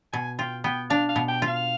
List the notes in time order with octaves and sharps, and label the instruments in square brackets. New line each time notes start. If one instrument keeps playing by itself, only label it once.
[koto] B2 [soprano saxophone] G#5
[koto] F4 [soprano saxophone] G5
[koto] B3 [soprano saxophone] G5
[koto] D4 [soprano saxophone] F5
[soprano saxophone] F5
[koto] B2
[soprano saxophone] G5
[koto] F4
[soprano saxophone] F5